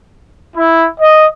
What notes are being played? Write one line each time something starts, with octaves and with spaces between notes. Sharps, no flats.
E4
D#5